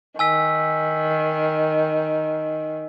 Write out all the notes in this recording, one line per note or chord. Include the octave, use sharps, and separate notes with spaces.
D#3 G#5 E6 B6